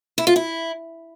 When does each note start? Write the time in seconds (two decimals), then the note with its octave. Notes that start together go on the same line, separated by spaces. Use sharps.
0.18 E4
0.27 F4
0.36 E4